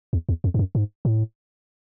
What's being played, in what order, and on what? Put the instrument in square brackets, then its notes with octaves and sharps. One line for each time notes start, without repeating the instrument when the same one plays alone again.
[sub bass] E2
E2
F2
G2
F#2
G#2
A2